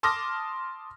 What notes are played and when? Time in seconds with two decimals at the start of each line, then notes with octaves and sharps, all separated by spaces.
0.03 A5 C6 D6 D#6 F6 A#6